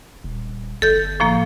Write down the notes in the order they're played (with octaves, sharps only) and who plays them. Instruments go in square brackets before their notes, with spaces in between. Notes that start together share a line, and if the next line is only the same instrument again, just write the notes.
[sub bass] D#1
[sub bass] G1 [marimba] A4 G6
[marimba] A2 F3 A#3